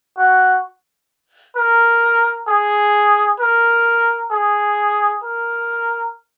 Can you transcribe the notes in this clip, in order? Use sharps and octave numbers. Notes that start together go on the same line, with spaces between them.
F#4
A#4
G#4
A#4
G#4
A#4